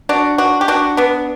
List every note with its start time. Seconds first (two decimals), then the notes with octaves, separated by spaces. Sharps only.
0.09 D4 F#4
0.38 D4 F#4
0.61 G4
0.68 D4 F#4
0.97 B3 D4